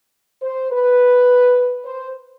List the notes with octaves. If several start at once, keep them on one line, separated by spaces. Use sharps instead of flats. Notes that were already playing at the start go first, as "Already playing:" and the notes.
C5
B4
C5